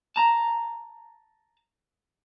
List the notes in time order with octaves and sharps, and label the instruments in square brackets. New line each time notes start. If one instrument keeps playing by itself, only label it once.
[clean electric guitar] A5 A#5